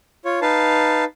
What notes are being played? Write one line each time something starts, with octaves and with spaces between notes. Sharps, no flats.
F4 C#5
D#4 B4 F5 A5